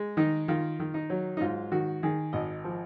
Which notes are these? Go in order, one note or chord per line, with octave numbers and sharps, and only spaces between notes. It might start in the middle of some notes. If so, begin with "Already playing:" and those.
Already playing: G#3
D#3 D#4
D#3 F4
D#3
D#4
F#3
D#4
G#2 F4
D#3 F#4
D#3 G#4
G#1 D#5
F3